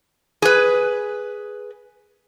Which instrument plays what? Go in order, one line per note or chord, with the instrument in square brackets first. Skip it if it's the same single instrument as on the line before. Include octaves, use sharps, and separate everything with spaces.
[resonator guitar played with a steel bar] G#4 B4